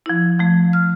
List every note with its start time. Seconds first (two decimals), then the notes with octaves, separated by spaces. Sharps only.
0.06 F3 E4
0.39 F3 A3
0.73 F6